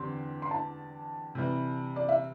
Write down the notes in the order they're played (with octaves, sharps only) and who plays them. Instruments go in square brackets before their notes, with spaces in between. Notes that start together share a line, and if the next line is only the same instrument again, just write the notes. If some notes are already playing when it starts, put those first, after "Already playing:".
Already playing: [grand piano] E2 D3 C4 G4 [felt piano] C6
[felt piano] C6
A5
[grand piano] C3 E3 G3
[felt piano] D5
E5